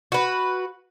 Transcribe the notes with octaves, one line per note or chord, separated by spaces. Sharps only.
F#4 B4